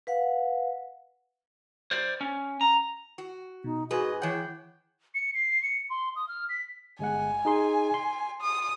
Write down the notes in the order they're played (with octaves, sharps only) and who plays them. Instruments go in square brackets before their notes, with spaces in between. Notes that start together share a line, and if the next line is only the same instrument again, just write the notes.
[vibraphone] B4 F5 F#5
[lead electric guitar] C5 D5
C#4
A#5
[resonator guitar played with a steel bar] F#4
[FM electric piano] B2 [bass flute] D#4
[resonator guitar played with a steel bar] G#2 B4 [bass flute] F#4 [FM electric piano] G#4 G#5 [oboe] D#5
[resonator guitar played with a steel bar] E3 F#5 [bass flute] C#5 [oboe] G5
[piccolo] C#7
C7
C#7
C6
D#6
F6
B6
[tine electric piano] G1 G#3 F#5 [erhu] G#5
[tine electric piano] D#4 G#4 C6
C6
[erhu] D#6